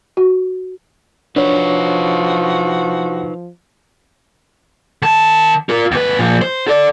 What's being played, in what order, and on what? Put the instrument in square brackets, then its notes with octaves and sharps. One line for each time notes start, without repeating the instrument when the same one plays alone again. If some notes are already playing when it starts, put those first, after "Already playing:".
[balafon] F#4
[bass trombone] F3 [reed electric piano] D4 C#5 [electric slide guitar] D#4 B4 [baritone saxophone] F#4
[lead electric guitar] D#3 A5
F4 A#4
D#2 B4
A#2 F3
C5
A4 D5